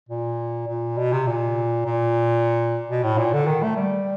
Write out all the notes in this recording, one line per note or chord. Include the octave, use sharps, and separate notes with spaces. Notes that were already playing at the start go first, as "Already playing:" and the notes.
A#2
A#2
B2
C3
A#2
A#2
B2
A2
A#2
D3
D#3
A3
G3